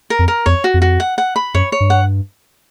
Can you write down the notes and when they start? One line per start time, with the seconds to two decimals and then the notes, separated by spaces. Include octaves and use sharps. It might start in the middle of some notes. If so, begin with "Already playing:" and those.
0.10 A#4
0.19 F2
0.28 A#4
0.46 F2 C#5
0.64 F#4
0.74 F2
0.82 F#4
1.00 F#5
1.18 F#5
1.36 B5
1.54 F#2 C#5
1.72 C#5
1.80 G2
1.90 F#5